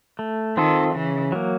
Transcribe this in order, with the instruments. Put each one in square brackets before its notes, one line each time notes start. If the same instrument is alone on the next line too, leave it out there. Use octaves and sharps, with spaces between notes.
[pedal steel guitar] A3
[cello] D#3 [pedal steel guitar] C4 F4 A4
[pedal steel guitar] C#3 [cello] E3
[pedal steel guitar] F#3 A#3